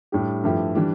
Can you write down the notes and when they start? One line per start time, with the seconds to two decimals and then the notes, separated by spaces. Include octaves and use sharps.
0.12 A2 G3 D4 G4
0.44 G2 F3 A3 E4 G4
0.75 E3 G3 D4